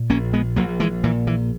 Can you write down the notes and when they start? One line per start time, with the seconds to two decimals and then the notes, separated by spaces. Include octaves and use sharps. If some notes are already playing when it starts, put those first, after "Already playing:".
Already playing: A#2
0.10 A#1 A#3 C#4
0.33 G#3 B3
0.56 A#1 F#3 A#3
0.80 E3 G#3
1.04 A#2 E3
1.27 E3